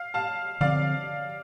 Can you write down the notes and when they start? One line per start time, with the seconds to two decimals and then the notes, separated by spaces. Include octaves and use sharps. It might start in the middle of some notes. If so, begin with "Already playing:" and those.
Already playing: F5
0.14 F5 A5
0.60 D3 F3 C4 D5 F5